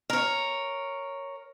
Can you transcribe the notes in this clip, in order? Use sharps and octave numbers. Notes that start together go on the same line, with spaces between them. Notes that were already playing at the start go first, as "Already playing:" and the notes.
A#4 C#5